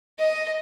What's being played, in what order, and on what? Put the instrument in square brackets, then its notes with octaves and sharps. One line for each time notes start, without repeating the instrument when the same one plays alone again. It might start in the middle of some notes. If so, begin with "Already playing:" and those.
[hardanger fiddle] D#5